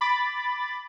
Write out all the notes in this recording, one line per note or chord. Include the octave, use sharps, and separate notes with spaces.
B5 D6 A6